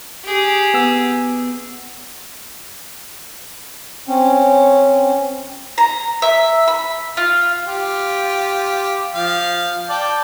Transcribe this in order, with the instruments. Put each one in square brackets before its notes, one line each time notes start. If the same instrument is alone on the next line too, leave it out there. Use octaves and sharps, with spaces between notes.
[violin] G4 G#4
[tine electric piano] B3 E6
[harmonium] C4 C#4
[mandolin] A#5
E5
B5
F4
[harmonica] F4 G4
F3 F5
D5 G5 A5